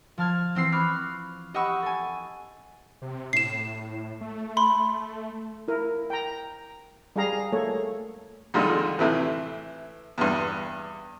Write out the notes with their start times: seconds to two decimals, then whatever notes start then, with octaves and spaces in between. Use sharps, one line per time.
0.18 F3 A5 F6 G#6
0.55 E3 C4 E6 C7
0.72 B5 C#6 D6 F6 F#6 G#6
1.54 G4 D#5 F#5 B5 C#6 E6
1.82 A4 G#5
3.02 C3
3.33 A2 C7 E7
4.21 A3
4.57 B5 C6
5.68 E4 A#4
6.10 G5 A#5
7.16 G3 G#4 F5 A#5
7.53 A3 A#3 A4 C#5
8.54 F2 A#2 D3 D#3 G3 G#3
8.99 A2 C3 E3
10.18 E2 G2